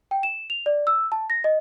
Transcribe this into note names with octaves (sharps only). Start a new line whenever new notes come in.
G5
E7
F7
D5
E6
A5
A#6
D#5